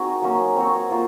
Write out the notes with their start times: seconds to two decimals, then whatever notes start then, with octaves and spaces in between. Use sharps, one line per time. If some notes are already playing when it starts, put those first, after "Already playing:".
Already playing: C4 D#4 F#4 G#4 A#4
0.22 F#3 A#3 C#4
0.56 C4 F#4 C#5
0.89 A#3 F4 C5